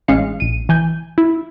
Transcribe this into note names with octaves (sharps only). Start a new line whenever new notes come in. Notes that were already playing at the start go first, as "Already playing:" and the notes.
A1 G#3 C#4 F5 C#7
A#1 D#7
E3 G#5 G6
E4